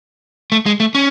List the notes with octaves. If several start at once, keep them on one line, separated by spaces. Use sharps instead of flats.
A3
G#3
A3
C#4